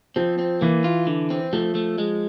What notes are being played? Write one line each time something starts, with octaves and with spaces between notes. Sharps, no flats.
F3 C4
C4
E3 A#3
F4
D3
C4
F3 A3
A3
G#3